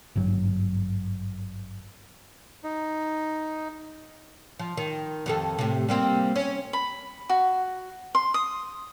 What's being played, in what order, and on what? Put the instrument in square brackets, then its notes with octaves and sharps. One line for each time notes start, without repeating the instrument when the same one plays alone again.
[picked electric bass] G#1 G2 F#3
[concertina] D#4
[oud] F3
D#3
F2 D#3 A4
A2 C3
G3 A#3 C4
C#4
[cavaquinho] B5
F#4
C6
D#6